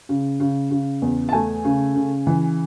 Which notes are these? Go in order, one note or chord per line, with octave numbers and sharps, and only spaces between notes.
C#3
C#3
C#3
E2
A5
A3 G#5
C#3
C#3
E3